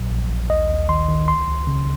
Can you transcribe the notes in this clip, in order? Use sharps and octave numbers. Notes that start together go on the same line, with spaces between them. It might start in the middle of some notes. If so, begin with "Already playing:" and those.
Already playing: A#1 A#2 F#3
A#1
A#1
D#2 D#5
D#2
D#3 C6
D#3
C#2 C6
C#2
C#3